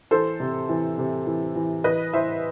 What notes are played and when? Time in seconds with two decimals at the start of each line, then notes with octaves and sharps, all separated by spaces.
0.11 E3 A4 C5
0.40 C3
0.69 E3
0.98 C3
1.26 E3
1.56 E3
1.84 E3 B4 D#5
2.13 E3 C5 E5